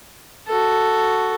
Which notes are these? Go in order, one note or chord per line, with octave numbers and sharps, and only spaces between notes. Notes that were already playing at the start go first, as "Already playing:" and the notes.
F#4 A4